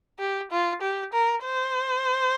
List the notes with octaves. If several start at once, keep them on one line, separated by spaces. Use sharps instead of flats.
G4
F4
G4
A#4
C5